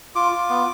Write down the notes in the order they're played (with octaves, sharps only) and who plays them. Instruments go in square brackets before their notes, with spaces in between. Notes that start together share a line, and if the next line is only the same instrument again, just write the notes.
[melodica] F4 D6
F4
B3